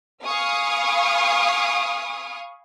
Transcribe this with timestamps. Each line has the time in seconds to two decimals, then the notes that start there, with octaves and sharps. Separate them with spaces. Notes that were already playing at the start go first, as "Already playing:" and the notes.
0.25 F5 G#5 B5 C#6 D#6 F6